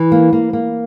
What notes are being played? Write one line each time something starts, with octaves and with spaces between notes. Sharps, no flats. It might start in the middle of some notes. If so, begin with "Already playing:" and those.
Already playing: E3
A#3
A#3
A#3